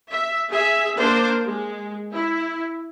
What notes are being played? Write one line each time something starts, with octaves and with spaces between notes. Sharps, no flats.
E5
G#4 E5
A#3 D4 A#4 C5
G#3
E4